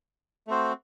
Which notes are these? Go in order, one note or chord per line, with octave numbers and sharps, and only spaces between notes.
A3 C4 F#4 C5